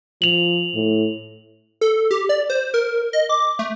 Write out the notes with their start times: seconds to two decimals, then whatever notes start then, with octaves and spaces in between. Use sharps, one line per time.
0.22 F3 F7 F#7
0.75 A2
1.81 A4
2.11 G4
2.29 D5
2.50 C5
2.74 A#4
3.13 D#5
3.29 D6
3.59 A3